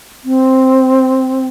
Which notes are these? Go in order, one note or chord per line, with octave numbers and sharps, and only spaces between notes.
C4